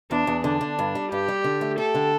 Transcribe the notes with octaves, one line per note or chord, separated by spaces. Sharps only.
E2 D4
E2
D3 D4
D3
G2
G3
G2 G4
G3
D3
A3
G4 A4
D3